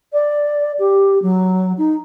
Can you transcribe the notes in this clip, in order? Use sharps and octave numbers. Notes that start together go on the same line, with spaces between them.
D5
G4
F#3
D#4